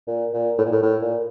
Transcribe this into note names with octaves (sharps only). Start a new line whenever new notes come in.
A#2
A#2
A2
A#2
A2
A2
A#2